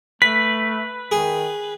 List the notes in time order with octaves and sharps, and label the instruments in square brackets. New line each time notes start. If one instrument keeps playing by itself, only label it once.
[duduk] A3 [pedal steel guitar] B4 [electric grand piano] B6
[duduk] D#3 [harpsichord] G#4